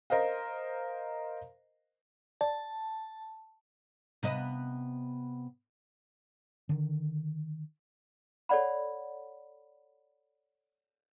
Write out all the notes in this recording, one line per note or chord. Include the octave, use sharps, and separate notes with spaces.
A#4 C5 D#5 F5
D5 A5
C3 B3 D#5
D3 D#3
A4 C#5 D5 F#5 B5